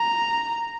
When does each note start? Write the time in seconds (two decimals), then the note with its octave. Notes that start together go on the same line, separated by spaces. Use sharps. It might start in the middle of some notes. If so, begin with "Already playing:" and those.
Already playing: A#5